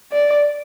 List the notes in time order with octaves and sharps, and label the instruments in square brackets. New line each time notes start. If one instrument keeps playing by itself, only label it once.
[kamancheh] D5